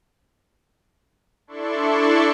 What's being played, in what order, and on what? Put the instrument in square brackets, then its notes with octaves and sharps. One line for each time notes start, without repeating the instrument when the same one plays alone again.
[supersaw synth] D4 E4 A4 D5 C6 C#6